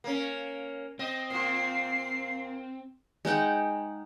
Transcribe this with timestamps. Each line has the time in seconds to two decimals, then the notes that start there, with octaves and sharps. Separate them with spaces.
0.04 A#3 C#4
0.99 C4 D#5
1.30 A#2 F4 C7
3.25 G#3 D#4 F#5 G5